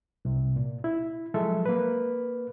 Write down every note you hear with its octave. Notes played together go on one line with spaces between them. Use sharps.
C2 C3
A#2
E4
F3 F#3 G#3 A4 E5
A#3 B4